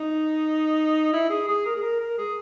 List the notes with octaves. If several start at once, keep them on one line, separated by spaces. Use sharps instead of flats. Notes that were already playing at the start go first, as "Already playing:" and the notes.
Already playing: D#4
E4
G#4
G#4
A#4
G#4
A#4
A#4
G#4